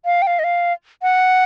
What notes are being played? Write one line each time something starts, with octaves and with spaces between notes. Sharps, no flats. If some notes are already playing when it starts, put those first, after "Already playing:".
F5
G5
F5
D#5
F5
F#5